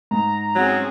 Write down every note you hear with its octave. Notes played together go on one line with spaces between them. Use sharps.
G#2 A#5
F#3 C4 C#4 G#4